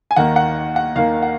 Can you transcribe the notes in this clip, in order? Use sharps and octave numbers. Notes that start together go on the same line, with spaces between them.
G#5
D#2 D#3 A#3 F#5
F#5
F#5
D#2 D#3 A#3 F5
F#5